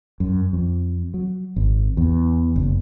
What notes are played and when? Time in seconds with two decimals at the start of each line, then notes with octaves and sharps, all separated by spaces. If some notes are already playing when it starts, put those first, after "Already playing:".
0.20 F#2
0.53 F2
1.14 F#3
1.56 G#1
1.97 E2
2.56 F#1